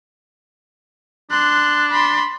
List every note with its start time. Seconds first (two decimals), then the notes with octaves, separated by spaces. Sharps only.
1.31 D4 C6 F#6
1.91 B5 C6